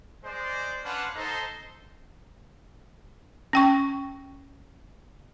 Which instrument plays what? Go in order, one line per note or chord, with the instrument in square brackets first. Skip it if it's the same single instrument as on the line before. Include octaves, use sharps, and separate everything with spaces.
[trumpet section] G#3 C5 D5
C#4 D4 B4 C5 F5 F#5
D#4 A4 C5
[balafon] C#4 G5 C#6